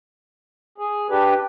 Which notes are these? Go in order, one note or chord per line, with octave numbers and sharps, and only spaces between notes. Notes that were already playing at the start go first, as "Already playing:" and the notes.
G#4
D4 G4 B4